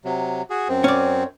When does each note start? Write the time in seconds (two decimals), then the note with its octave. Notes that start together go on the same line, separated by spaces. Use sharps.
0.05 C3 F#3
0.50 F#4 G#4
0.69 F#2 C4
0.84 C#4 D5